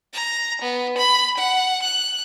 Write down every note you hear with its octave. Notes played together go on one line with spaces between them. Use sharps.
A#5
B3
B5
F#5
F#6